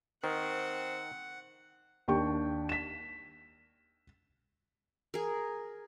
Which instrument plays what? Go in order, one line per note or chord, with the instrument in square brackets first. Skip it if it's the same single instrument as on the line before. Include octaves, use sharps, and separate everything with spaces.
[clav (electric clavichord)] D#3 [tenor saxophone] C4 [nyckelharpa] F#5
[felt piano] D#2 D4 G4 G5 C#6
B6 E7
[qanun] G#4 A#4